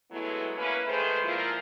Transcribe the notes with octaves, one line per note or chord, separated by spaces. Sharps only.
F#3 G#3 A3 B3 E4
A#3 C#4 E4 B4
D#3 G#3 A3 G#4 B4 C5
A#2 F3 A#3 E4 F4 A#4